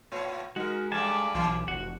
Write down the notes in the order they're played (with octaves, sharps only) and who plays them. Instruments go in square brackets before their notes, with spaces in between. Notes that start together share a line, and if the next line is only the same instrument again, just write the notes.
[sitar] A2 B3 C#5
[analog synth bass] G#3 [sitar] D#4 A#4 [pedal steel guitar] F#4
[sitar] G2 G3 [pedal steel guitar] G#5 A5 [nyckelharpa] B5 D6
[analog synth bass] B1 [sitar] E3
[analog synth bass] F1 [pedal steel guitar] F#4